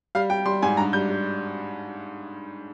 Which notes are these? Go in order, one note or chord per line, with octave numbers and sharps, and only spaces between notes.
G3 F5
G3 G5
G3 C6
G#2 G#5
G2 A#5
G3 G6
G3